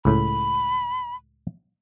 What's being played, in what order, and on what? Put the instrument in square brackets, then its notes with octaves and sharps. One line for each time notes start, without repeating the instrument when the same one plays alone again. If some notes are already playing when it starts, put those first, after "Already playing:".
[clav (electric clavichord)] C#2 A2 [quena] B5